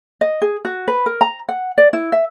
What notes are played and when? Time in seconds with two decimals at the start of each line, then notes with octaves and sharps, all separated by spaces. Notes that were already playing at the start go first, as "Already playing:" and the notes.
0.21 D#5
0.42 G#4
0.65 F#4
0.88 B4
1.06 A#4
1.21 A#5
1.49 F#5
1.78 D5
1.93 E4
2.12 E5